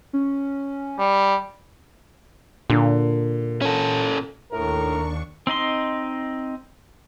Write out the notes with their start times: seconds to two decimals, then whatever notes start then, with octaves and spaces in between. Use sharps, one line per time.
0.13 C#4
0.99 G3
2.70 A#2 D3
3.62 C#4 A4
4.52 D#2 A2 D4 A#4 C#6
5.47 C4 D#4 D#5 C6